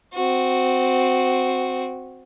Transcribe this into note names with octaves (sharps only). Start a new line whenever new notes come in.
C4 F#4